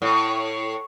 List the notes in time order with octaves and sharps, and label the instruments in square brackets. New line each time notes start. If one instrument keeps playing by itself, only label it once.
[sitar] A2